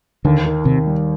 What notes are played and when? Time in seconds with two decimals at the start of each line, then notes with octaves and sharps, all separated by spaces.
0.25 D#2 D3
0.44 D#3
0.65 D#2 C3
0.86 G3